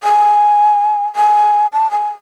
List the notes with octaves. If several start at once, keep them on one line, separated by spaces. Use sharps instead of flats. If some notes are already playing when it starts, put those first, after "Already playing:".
G#5
G#5
A5
G#5